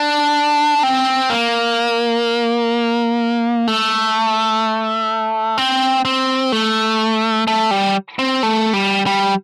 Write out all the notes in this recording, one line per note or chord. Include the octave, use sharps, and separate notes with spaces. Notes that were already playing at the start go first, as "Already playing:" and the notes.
Already playing: D4
C4
A#3
A3
C4
C4
A3
A3
G3
C4
A3
G3
G3